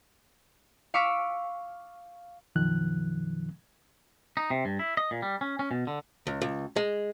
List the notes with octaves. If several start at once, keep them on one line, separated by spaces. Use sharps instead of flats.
F5 C#6 D6 E6 B6 D7
F#2 B2 D#3 F3 F#6
D#4
C3
G2
E4
D#5
A#2
G3
C#4
C#4
B2
D3
C#2
C#2
G#3